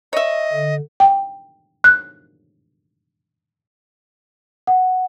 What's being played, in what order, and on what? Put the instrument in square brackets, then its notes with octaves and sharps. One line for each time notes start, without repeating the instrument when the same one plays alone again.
[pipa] C#5 E5 [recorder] D#5
[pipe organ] D3
[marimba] G5
F#6
[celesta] F#5